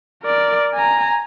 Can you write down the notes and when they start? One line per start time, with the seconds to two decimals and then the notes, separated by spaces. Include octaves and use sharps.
0.23 A#4 D5
0.74 G#5 A#5